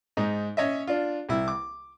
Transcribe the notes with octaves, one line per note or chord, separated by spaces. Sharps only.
G#2 D#4
C#4 C#5 D#5 E5
D4 F4
C2 E4
D6